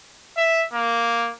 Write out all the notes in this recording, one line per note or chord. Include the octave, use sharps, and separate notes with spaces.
E5
A#3